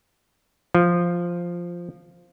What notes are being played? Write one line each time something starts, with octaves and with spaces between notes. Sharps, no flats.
F3